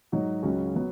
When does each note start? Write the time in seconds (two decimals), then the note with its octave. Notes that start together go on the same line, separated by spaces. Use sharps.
0.12 G#2 F#3 D#4 F#4
0.43 C#2 C#3 F#3 C#4 F#4
0.76 F#3 B3